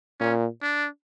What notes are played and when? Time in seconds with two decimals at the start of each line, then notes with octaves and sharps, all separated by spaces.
0.20 A#2 C#4
0.62 D4